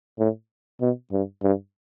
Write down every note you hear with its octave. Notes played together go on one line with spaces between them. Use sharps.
A2
B2
G2
G2